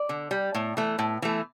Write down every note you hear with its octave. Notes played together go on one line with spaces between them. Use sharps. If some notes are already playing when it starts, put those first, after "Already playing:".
Already playing: D5
D3
G3
A2
E3 A3
A2
E3 A3